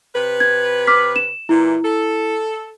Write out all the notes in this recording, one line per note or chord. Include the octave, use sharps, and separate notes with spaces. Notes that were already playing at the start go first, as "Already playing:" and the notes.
C3 B4
G#6
D6 F6 B6
E7
A#2 E3 E4
A4